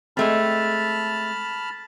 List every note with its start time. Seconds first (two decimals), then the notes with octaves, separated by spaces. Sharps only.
0.17 G#3 A3 C4 A5 B5 F6